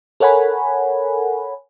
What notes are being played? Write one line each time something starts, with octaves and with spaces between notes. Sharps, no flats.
A4 A#4 C#5 F#5 G#5 B5